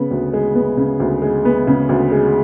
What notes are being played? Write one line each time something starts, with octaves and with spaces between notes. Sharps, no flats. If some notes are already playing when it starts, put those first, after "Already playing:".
Already playing: C#3 B3
D2
G#3
B3
C#3
D2
G#3
B3
C#3
D2
G#3